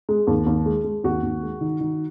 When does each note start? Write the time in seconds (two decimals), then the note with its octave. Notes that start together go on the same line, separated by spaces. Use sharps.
0.09 G#3
0.27 D#2
0.46 D#2
0.66 G#3
0.84 G#3
1.04 D#2 F#4
1.23 D#2
1.42 G#3
1.61 D#3
1.80 D#3